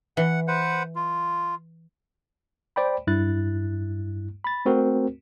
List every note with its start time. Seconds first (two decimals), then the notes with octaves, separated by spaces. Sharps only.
0.17 E3 F#5
0.48 B4 C5 F#5
0.96 F4
2.76 C5 D5 G5 B5
3.07 G2 E4 F#6 A6
4.44 B5 A6
4.65 A3 C4 F#4 A#4